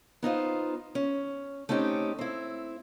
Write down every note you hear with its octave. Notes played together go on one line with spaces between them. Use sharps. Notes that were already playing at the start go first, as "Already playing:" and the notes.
B3 D#4 F4 C5
C#4
A3 C4 C#4 D#4 G4
C4 E4